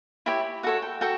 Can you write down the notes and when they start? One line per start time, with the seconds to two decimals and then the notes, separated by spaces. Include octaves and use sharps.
0.26 E4 G4 C#5 E5
0.63 F#4 A4 C#5 F#5
0.82 G5
1.01 F#4 A4 G5